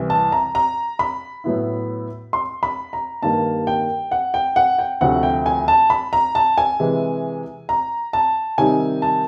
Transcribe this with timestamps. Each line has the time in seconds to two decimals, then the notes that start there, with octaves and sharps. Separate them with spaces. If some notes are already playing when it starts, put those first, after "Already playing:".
Already playing: C2 C3 E3
0.10 A5
0.32 A#5
0.55 A#5
0.99 B5
1.44 A2 F#3 B3 E4
2.33 C6
2.63 B5
2.93 A#5
3.22 G2 D#3 G3 A#3 A5
3.67 G5
4.11 F#5
4.34 G5
4.56 F#5
4.79 G5
5.01 D2 C3 F3 A3 F#5
5.23 G5
5.46 G#5
5.68 A5
5.90 B5
6.13 A#5
6.35 A5
6.58 G#5
6.79 C3 E3 G#3
7.69 A#5
8.13 A5
8.58 C3 D#3 G3 C4 D#4 G#5
9.02 A5